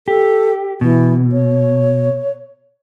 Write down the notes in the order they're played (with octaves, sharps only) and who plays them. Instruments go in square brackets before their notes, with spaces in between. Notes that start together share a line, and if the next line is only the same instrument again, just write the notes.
[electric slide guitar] G4 [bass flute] A4
[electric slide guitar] B2 [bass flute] E3
[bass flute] C#5